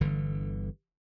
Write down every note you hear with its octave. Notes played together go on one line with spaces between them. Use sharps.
G1 D3 E3